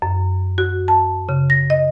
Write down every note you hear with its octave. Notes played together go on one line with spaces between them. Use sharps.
F#2
F#4
A5
C#3
A#6
D#5